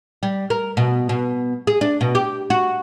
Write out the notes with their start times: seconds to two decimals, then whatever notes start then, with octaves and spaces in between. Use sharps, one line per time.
0.23 G3
0.50 A#4
0.77 B2
1.09 B2
1.67 G#4
1.81 D4
2.01 B2
2.15 G4
2.50 F#4